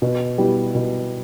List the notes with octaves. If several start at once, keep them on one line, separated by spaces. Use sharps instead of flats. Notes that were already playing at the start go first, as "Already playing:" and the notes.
B2
G3 B3 E4
B2